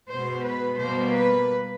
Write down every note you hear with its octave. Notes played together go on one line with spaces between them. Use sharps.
B2 G#3 B3 C5
B4
B2 G3 A#3 C5
B4